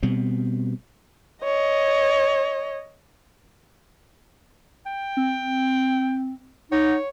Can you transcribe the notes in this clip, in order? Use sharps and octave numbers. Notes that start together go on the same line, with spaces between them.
B2 G3 B3 C4
C#5 D#5
G5
C4
D#4 C#5 F#5